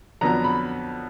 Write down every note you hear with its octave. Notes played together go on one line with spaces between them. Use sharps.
F2 D3 F#3 B3 D4 A#5
B5